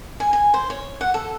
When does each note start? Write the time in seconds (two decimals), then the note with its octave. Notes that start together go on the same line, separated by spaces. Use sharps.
0.20 G#5
0.33 G#5
0.54 C5
0.70 C#5
1.01 F#5
1.14 A4